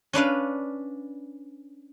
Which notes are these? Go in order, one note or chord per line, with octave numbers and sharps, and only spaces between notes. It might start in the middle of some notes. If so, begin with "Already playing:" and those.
C#4 D4 B4 F5